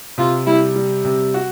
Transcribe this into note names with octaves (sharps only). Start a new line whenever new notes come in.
C3 F4
G3 E4
G3
C3
F#4